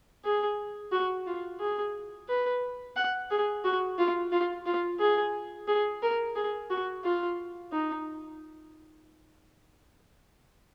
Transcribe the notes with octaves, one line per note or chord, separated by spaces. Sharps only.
G#4
F#4
F4
G#4
B4
F#5
G#4
F#4
F4
F4
F4
G#4
G#4
A#4
G#4
F#4
F4
D#4